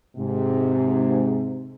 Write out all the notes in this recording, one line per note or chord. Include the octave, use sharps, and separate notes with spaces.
G#2 C3